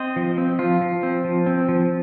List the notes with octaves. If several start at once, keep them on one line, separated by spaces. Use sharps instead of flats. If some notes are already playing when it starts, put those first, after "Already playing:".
Already playing: C4 C5 D#5
F3
C4
F3 F4
F3
C4
F3
C4
F3